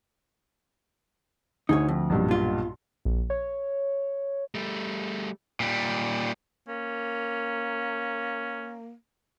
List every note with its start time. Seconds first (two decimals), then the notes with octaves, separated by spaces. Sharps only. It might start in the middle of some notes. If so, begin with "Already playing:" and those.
1.69 D2 D#4 G#4 C#5
1.88 F2
2.10 B1 G2 A#2
2.28 B2 F4
3.05 A#1
3.30 C#5
4.55 G3 A3
5.60 A#2 G3
6.68 A#3 C#4